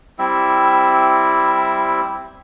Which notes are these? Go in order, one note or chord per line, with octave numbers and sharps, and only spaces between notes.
G3 C4 E4 E5